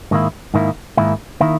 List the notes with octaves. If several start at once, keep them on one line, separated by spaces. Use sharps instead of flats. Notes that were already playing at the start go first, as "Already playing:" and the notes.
G#2 D#3 A#3 E4
G#2 D#3 A#3 E4
G#2 D#3 A#3 E4
D#3 A#3 E4